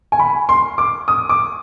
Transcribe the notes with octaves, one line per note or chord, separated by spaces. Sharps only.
G#5
B5
C6
D6
D#6
D6